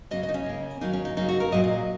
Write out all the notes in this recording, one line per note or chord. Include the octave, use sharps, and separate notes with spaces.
C#3 F#3 A#3 D#5
D#5
D#4
C#4
C#3 A#3
D#3 F#3 A#3 D#4
C#4
D#4
C#3 F#3 A#3 D#4
F#4
A#4
A#2 F#3 A#3 D#5
D#5